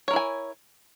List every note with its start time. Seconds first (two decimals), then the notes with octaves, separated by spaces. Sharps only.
0.08 C#5
0.11 A#4
0.13 E4
0.16 G#5